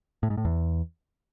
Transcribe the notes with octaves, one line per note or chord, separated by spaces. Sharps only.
A2
G#2
A2
E2